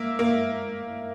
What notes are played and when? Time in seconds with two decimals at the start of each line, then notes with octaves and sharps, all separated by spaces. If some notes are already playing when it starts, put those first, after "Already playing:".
Already playing: A#3 E5
0.19 A#3